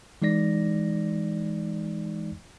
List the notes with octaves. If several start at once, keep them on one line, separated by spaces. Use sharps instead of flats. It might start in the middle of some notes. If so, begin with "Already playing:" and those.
E3 G#3 D#4 D5 A#6